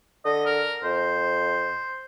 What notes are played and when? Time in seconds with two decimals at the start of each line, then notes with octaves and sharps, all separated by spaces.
0.25 D3 D#5
0.46 A#4
0.83 F2 C5